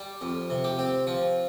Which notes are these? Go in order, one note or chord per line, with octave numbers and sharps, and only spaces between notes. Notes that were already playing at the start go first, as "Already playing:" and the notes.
Already playing: G3
F2
C3
G4
C4
F3